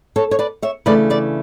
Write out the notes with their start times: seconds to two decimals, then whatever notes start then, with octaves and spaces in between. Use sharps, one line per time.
0.16 A4 C#5
0.31 C#5
0.39 B4 D5
0.62 C#5 E5
0.86 C#3 E3 A3 D4 B4 D5
1.10 B4 D5